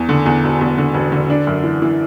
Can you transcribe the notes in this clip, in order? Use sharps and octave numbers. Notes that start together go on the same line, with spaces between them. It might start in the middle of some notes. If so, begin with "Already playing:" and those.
Already playing: E2
D3
E2
E1
E2
D3
E1
D3
D4
F#2
E3
E3